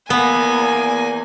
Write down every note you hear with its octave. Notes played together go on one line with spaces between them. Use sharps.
E2 A#3 B3 G#5 B5